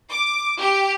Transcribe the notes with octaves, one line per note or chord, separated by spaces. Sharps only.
D6
G4